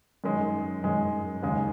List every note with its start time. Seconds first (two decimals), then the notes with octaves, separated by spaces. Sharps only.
0.24 F#2 D#3 G#3
0.83 F#2 D#3 G#3
1.43 D#2 C#3 G#3